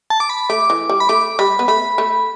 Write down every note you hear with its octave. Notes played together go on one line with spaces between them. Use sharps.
A5
D6
B5
A3 D6
E3
G3
B5
A3 D6
G3 B5
B3
A3 B5
A3